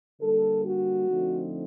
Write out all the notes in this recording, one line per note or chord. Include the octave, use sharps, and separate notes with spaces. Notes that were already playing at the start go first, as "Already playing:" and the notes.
D3 G3 A#3 A4
F#4
D3 F3 A3 C4 D#4